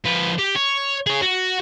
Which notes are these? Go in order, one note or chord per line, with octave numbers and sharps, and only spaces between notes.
F3 B4
G4
C#5
G#4 C#5
F#4